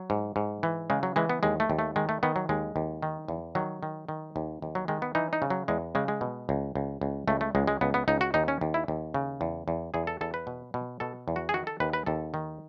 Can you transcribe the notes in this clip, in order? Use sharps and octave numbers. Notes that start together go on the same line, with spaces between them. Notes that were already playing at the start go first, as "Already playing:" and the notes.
Already playing: F#3
G#2
G#2
E3
C#3 G#3
F#3
E3 G#3
B3
D#2 G#3
A3
D#2
A3
D#3 G#3
A3
D#3 B3
F#3
D#2 G#3
D#2
D#3
E2
D#3 F#3
D#3
D#3
D#2
D#2
F#3
D#3 G#3
B3
E3 D#4
D#4
C#3
F#3
E2 G#3
C#3 G#3
G#3
B2
C#2
C#2
C#2
C#2 A3
A3
C#2 G#3
G#3
C#2 B3
B3
C#2 D#4
F#4
D#2 D#4
C#4
D#2
E4
D#2
C#3
E2
E2
E2 G#4
A4
E2 A4
B4
B2
B2
B2 A4
E2
F#4
G#4
D#3 F#4
A4
D#2 B4
B4
D#2 A4
D#3